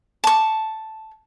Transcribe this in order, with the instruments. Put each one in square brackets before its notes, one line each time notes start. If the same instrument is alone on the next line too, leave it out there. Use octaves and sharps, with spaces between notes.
[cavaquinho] A5 C#6